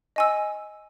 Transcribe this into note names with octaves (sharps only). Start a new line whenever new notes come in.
D#5 G#5 E6